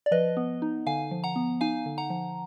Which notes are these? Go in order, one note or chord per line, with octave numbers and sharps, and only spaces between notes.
D5
F3 B4 D#5
B3
D#4
D3 F5 G#5
F3
F#5 A#5
B3
D#4 F5 G#5
D3
F#5 A#5
F3